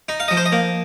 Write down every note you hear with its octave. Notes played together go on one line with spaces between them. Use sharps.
D#4
F5
F3 D#5
C5
D#5
A#3